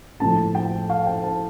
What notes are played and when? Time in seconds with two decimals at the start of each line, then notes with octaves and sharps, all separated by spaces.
0.20 A2 F3 A5
0.55 G5
0.89 F5
1.07 G5
1.24 A5